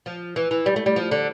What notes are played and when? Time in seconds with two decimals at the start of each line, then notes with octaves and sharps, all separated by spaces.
0.06 F3
0.36 E3
0.51 E3
0.66 G3
0.76 A3
0.86 G3
0.96 F3
1.11 D3